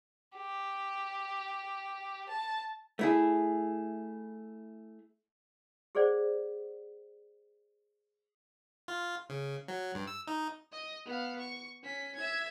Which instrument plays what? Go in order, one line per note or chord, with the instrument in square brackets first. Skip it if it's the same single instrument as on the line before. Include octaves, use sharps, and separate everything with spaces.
[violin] G4
A5
[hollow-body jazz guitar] A3 E4 G#4
[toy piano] G4 G#4 C5 D5 F#5
[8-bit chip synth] F4
C#3
F#3
G2
E6
D#4
[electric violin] D#5
B3 F5
C#6
C#4 B6
E5 G#6